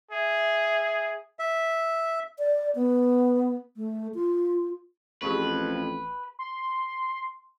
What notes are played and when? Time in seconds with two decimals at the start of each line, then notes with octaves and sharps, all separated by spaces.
0.11 G#4 E5
1.39 E5
2.39 D5
2.75 B3
3.77 A3
4.14 F4
5.22 A1 F2 G4 G#4 B4 C#6
6.39 C6